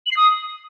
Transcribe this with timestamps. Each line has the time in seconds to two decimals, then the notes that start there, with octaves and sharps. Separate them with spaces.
0.06 F#7
0.11 C7
0.17 D#6